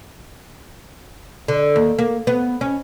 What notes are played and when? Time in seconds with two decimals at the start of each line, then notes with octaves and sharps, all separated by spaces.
1.48 D3
1.76 D#2
1.98 A#3
2.27 B3
2.61 C#4